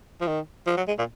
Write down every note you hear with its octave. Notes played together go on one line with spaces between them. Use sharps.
F3
D#3
F3
F#3
G#3
A#2